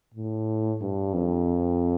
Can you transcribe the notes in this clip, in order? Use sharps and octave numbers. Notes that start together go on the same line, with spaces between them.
A2
G2
F2